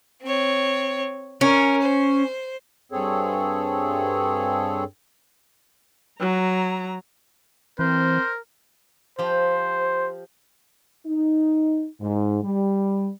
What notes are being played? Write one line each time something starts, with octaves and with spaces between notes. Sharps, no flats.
C4 C#5
C#4 A#4
C5
G2 C4 G#4 A4 C#5
F#3 A#5
E3 C4 A#4 C5
F3 G4 C5
D#4
G#2
G3